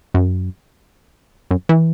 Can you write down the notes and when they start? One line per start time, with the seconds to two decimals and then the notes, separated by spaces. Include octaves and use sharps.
0.14 F#2
1.51 F#2
1.69 E3